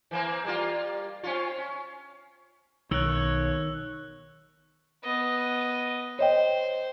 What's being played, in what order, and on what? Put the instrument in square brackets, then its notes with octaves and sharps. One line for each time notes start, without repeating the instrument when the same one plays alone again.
[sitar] E3 A#3 C4
G3 A#3 F4
C4 C#4 F4
C#4
[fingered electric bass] B1 [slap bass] D#3 [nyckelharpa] C#5 [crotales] E6 F#6
[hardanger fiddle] B3 D#5
[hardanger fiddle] C5 [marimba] C#5 D#5 G5